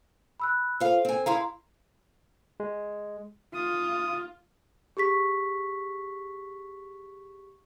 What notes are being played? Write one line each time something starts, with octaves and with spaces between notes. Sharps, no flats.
B5 E6 F#6
F4 A4 C5 F5
C4 G#5
E4 G#4 F5 A#5 C6
G#3
F4 D#6
G4 G#4 C#6 B6